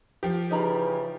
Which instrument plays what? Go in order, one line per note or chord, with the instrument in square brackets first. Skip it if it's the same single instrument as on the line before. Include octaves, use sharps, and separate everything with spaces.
[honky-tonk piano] F3 G4
[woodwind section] C#3 E3 [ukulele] D#4 A#5 B5